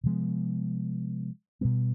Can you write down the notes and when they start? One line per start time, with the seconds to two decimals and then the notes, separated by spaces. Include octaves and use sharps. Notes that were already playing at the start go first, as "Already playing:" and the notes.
0.04 C3 F3 G#3 B3
1.61 B2 G3 B3